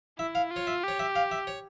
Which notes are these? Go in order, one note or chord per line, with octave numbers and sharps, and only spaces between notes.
E4 E5
F5
F4
C#5
E5
G4 C#5
E5
F5
E5
C#5